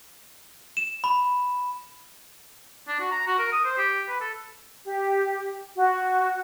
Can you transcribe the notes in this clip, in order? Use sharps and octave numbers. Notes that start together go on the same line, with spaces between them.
E7
B5
D4
F#4
A#5
F#4
A#4
D#6
C5
G4
B4
A4
G4
F#4